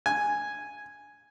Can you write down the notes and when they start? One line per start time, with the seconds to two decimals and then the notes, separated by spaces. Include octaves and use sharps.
0.06 G#5